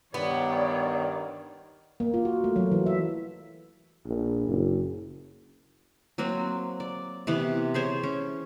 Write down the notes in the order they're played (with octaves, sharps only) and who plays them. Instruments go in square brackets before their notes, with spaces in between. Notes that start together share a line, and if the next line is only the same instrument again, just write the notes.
[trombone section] G2 D#3 [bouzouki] B3 [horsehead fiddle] C#5 D5
[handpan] A#3
F4
F#4
A3
F#3
E3
E5
[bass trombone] A#1
F#1
[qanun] F#3 A#3 C4 F#4
D5
C3 E3 B3
G#4 C5 C#5
C#4